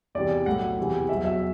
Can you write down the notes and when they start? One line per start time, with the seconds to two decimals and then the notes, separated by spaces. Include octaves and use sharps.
0.15 E2 C3 E3 D5
0.46 B1 A2 F#3 F#5
0.78 E2 C3 E3
1.09 E2 B2 F#3 E5
1.25 E5